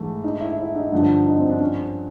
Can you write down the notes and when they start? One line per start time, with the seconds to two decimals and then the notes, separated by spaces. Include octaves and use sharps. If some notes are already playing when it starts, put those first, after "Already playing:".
Already playing: G#2 E3 A3
0.24 D#4
0.41 E4
0.57 E4
0.75 D#4
0.92 G2 D3 F3
1.26 D#4
1.37 C4
1.50 D4
1.60 C#4